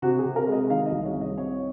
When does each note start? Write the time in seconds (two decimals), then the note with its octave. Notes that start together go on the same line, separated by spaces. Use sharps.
0.02 C3 F#4
0.19 G#4
0.25 C3
0.36 A#4
0.47 G#3 D#5
0.70 D#3 F5
0.86 D#5
0.92 C2
1.04 C#5
1.15 C2
1.21 D#5
1.38 C4 C#5